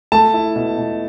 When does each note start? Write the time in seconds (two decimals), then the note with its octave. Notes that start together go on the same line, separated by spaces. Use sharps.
0.12 A3 A5
0.34 E4
0.56 B2
0.78 B2